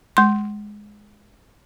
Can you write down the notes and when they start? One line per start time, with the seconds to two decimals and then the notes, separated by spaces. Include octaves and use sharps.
0.17 G#3 C6